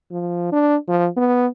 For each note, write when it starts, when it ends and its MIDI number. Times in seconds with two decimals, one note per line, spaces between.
0.11 0.48 53
0.52 0.76 62
0.88 1.07 53
1.17 1.47 59